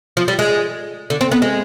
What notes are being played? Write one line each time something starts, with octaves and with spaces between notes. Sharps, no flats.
F3
G3
G#3
D3
C4
B3
G#3